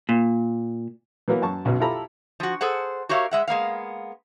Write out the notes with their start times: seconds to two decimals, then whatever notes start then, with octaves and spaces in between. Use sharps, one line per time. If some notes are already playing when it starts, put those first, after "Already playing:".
0.09 A#2
1.28 E3 F#3 A#3 B3
1.42 F#2 A5 C#6
1.65 B1 F#2 B2
1.80 E4 F4 G4 A4 A#5 B5
2.40 F3 F#4
2.61 G#4 A4 C5 F#5
3.09 F#4 G4 A#4 C#5 E5 F5
3.31 G#3 E5 F#5
3.48 G#3 A#3 B3 F5